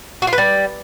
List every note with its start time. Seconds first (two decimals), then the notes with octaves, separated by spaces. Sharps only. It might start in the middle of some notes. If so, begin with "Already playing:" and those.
0.22 F#4
0.27 F4
0.33 B4
0.38 G3